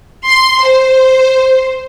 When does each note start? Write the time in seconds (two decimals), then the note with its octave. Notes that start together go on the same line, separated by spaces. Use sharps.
0.25 C6
0.64 C5